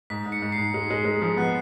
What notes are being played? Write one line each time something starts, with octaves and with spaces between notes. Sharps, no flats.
G#2 B6
G#2
C#7
G#2
C7
G#2
G#3
G#3
G#3
F3
B3 F#6